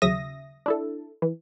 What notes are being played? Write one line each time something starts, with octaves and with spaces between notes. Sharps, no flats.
D#2 C#3 F#3 E5 D#6 A#6
D4 E4 A4
E3